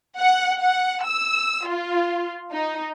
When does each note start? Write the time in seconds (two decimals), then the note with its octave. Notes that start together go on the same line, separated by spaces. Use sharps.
0.18 F#5
0.61 F#5
1.06 E6
1.68 F4
2.51 D#4